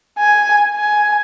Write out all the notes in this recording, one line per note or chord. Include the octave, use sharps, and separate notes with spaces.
G#5
G#5